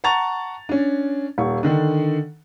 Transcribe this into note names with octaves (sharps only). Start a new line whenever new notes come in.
F#5 A5 A#5 C#6 A6 F7
C#4 D4
D#1 C#6
D3 D#3 D4